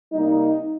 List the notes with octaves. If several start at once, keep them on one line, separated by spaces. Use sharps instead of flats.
C3 G3 A#3 D#4